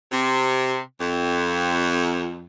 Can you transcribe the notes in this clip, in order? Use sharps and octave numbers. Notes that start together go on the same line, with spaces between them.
C3
F2